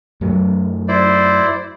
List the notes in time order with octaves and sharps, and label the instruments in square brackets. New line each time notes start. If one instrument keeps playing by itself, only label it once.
[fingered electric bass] F#2 F#3 A3
[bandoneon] E4 C5 D5